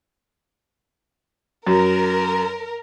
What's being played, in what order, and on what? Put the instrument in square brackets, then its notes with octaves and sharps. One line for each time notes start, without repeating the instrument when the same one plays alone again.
[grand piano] F#2 [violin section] A#4